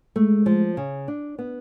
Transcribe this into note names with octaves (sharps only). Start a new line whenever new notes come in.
G#3 A3
F3
C#3
D4
B3